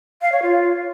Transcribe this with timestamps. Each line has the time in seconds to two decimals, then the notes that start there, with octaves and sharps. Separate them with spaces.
0.22 F5
0.32 C#5
0.42 F4